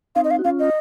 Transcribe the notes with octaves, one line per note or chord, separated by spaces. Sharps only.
C4 D#4 F5
D#5
F5
F#4
C#4 F4 F5
D#5